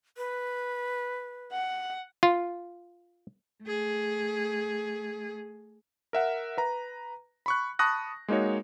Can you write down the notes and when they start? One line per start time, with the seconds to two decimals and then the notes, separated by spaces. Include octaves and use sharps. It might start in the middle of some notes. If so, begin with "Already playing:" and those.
0.17 B4
1.53 F#5
2.23 F4
3.64 A3 G#4
6.13 A#4 E5 F#5
6.57 B4 A#5
7.46 B5 C#6 F#6
7.79 A5 B5 C#6 D#6 F#6 A#6
8.28 G#3 A#3 D#4 F#4 C#5